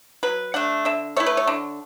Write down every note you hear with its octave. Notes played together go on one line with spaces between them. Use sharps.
F#3 B4
A3 D4 F#5
D3 E5
A3 E4 C#5
B4
C#5
D3